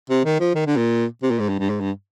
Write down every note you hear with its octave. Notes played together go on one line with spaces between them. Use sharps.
C3
D#3
F3
D#3
D3
A#2
C3
A#2
G#2
G2
G2
G#2
G2